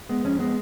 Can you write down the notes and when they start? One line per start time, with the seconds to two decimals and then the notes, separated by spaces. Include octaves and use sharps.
0.09 G#3 B3
0.25 F2 C#4
0.39 G#3 B3